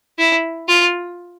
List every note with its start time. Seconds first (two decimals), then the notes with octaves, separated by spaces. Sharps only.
0.19 E4
0.68 F4